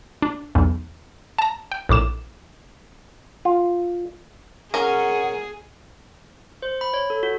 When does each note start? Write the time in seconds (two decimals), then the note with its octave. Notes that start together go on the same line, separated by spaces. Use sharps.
0.22 D4
0.55 B1 E2 G#2
1.39 A5 A#5
1.72 G5
1.89 A#1 A2 D6 E7
3.45 F4
4.74 C#4 G#4 A#4 F#5
6.62 C5
6.81 B5
6.94 C#5
7.10 A4
7.23 F#4